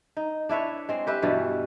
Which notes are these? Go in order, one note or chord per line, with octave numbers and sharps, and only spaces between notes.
D#4
D4 E4 B4 C#5
G#3 C4
G4 B4 E5
G2 B2 E3 G3